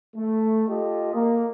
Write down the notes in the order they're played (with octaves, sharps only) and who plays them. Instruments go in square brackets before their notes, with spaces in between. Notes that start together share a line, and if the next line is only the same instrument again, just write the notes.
[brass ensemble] A3
F4 G4 A4 D#5
A#3